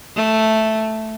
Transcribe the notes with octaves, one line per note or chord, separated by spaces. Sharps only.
A3